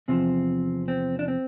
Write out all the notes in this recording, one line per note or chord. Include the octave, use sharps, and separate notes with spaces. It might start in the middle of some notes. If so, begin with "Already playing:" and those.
E2 C3 F3 C4
C4
D4
C4